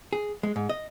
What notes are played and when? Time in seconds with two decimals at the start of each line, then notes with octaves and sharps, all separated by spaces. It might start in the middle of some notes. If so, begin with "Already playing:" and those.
0.13 G#4
0.43 G#3
0.56 G#2
0.69 D#5